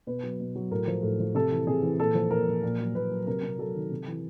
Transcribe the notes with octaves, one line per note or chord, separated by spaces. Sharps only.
B2 B4
F#3
B2
F#3
A2 A#4
F3
A2
F3
C3 A4
E3
C3 G#4
E3
A#2 A4
F3
A#2 A#4
F3
A#2
F#3
A#2 B4
F#3
C3 A#4
C3
F#3 A4
D#3
C3
E3